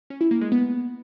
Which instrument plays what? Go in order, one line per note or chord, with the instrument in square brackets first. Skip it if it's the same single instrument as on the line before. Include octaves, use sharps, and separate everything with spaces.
[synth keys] C#4
E4
A#3
G#3
B3